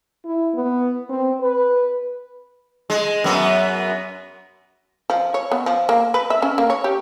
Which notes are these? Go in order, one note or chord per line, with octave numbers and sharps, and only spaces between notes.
E4
B3
C4
B4
G#3
F#2 B3
F3
C#5
B3
F3
A#3
B4
E5
C#4
A#3
C#5
G4